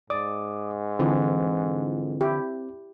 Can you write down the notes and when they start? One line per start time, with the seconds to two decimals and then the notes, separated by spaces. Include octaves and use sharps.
0.10 G#2 D5 D6 D#6
0.99 D3 E3 F3 C4
2.21 E4 G4